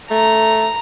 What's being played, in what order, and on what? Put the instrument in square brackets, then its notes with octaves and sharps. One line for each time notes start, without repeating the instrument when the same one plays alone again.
[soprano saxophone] A3 [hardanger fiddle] A#5